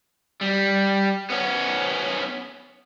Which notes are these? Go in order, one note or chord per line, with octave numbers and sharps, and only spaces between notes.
G3
B3 C#4